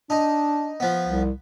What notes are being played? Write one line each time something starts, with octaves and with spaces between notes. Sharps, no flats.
D4 D#4
F3 B3
C2